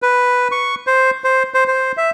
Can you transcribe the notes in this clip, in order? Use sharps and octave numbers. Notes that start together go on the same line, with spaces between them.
B4
C#6
C5
C5
C5
C5
E5